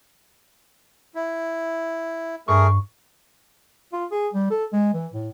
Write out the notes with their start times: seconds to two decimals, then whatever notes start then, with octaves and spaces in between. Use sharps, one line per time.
1.15 E4
2.48 G2 A3 G#4 A#4 C#6
3.93 F4
4.12 G#4
4.34 G3
4.50 A4
4.73 G#3
4.94 E3
5.13 A2